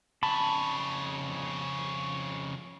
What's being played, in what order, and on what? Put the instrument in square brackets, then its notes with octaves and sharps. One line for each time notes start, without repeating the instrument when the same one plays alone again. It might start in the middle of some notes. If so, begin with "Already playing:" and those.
[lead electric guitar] F2 C#3 [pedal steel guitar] A5 B5